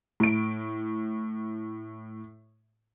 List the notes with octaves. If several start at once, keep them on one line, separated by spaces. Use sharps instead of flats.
A2 D7